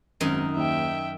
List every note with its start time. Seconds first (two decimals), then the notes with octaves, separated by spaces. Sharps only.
0.21 G#1 F#2 D#3 D#4
0.57 D#2 E5 G5